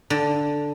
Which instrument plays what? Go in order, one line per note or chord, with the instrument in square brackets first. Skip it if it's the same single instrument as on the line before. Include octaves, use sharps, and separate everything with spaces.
[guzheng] D3